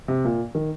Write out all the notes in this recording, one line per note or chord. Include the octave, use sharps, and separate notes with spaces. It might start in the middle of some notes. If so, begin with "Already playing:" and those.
C3
A#2
D#3